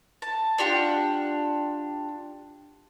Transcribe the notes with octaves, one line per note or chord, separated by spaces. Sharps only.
A5
D4 F4 G4 F#5